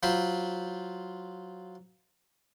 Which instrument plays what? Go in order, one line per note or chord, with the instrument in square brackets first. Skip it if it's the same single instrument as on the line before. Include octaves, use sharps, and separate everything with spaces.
[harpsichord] F#3 F4 C5 B5